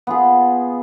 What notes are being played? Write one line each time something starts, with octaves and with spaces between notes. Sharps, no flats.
B3 F4 G#4